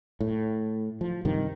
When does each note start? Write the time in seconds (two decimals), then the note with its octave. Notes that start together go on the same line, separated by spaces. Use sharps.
0.21 A2
1.01 F3
1.25 G2 C3 D#3